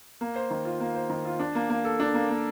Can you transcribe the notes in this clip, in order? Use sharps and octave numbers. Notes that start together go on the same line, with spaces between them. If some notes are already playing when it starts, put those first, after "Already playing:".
A#3
C5
D#3
F4
A#3
C5
D#3
F4
D4
A#3
A#3
A4
D4
A#3
A#3